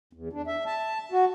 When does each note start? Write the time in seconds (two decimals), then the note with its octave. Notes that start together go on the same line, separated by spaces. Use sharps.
0.13 E2
0.33 D4
0.47 E5
0.66 A5
1.12 F#4